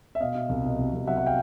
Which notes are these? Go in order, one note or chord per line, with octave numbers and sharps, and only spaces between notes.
E5
B2 D#5 F5
B2
C2
B2
C2
C2
F#3 E5 F#5
E5 F#5
F5 G5